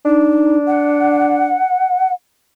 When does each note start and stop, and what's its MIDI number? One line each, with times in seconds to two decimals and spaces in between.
0.05 1.58 62
0.05 0.56 63
0.67 2.12 78